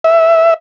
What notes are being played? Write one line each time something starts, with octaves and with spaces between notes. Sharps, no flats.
E5